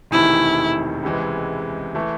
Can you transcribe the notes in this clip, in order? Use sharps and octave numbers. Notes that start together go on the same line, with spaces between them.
E1 E2 C3 D#3 A3 E4
C#2 C3 E3 G#3
E3 A3